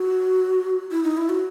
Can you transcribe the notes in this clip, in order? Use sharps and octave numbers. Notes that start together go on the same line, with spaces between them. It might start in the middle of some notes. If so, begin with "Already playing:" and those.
Already playing: F#4
E4
D#4
E4
F#4